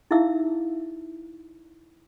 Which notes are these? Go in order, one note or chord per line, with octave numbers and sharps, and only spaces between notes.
D#4 E4 G#4 E5 F5 E6